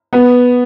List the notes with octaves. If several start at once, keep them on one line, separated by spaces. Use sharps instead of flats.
B3